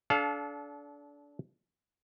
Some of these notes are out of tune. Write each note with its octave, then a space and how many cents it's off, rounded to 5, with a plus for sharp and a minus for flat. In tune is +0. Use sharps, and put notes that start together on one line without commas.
D4 -25 A4 -35 F5 +5